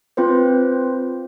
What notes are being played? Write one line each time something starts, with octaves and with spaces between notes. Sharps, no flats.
C4 F4 B4 C5